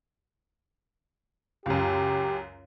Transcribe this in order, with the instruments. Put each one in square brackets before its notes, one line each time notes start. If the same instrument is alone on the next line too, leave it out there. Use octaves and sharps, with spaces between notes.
[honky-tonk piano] C#2 F#2 [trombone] G4